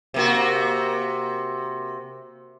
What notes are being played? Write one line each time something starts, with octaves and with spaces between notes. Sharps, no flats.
C3 A#3 F#4